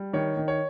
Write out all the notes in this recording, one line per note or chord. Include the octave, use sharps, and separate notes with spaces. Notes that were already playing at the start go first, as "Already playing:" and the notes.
Already playing: G3
D#3 C#5
D#3
C#5